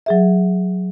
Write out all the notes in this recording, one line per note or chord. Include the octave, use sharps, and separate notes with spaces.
F#3 G#4 E5